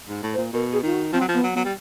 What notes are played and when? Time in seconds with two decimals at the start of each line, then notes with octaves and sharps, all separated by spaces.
0.09 G#2
0.23 A2
0.34 C5
0.38 A#2
0.53 B2 A#4
0.73 G#4
0.83 D#3 F4
0.93 F#4
1.13 F3 C4
1.21 F#3
1.28 F3
1.34 B3
1.44 F#3
1.54 F#3 B3
1.65 G3